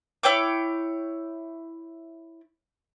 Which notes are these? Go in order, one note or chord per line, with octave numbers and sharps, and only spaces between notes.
E4 C#5 G5 D6